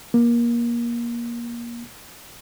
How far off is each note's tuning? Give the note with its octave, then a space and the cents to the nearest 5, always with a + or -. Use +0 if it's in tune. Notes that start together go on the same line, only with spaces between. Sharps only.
A#3 +25